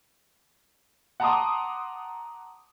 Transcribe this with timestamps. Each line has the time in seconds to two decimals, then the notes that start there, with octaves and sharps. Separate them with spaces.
1.20 F#5 A5 A#5 C6 D6 D#6